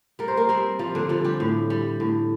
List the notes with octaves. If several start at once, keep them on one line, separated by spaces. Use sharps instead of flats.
G3 A#4
C5
A#3 A#4
G3 C4 C5
F3 G3 F4
D3 D4
F3 G3 F4
G3 G4
A2
G3
A2